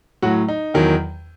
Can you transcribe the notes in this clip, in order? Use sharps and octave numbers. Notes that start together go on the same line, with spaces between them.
A2 F#3 F#4
D#4
E2 D#3 F#3